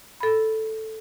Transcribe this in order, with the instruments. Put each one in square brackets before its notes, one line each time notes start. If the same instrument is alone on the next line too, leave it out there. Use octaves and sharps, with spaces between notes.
[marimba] A4 B5